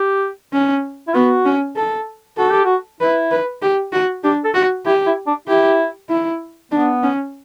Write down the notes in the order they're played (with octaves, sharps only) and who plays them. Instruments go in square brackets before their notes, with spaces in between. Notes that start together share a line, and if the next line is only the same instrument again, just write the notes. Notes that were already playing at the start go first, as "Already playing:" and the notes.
Already playing: [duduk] G4
[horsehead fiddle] C#4
[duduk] E4
[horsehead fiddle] B3 [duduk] F#4
[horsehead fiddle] C#4
A4
[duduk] F#4 [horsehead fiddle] A4
[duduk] G4
F#4
[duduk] E4 [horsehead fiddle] B4
[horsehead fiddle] B4
G4
F#4
[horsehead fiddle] D4 [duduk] G4
[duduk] A4
[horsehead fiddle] F#4
[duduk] E4 [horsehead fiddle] G4
[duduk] E4
D4
[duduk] E4 [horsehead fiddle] G4
[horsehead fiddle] E4
[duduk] B3 [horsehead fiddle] D4
[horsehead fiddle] C#4